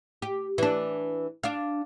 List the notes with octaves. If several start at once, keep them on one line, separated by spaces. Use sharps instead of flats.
G4
E3 D4
D4 F5